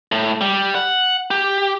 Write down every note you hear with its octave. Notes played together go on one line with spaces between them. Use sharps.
A2
G3
F#5
G4